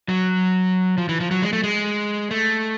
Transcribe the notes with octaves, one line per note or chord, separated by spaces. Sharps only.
F#3
F3
E3
F3
F#3
G#3
A3
G#3
A3